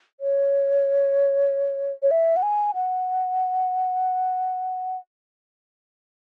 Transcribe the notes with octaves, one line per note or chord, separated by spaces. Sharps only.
C#5
C#5
E5
F#5
G#5
F#5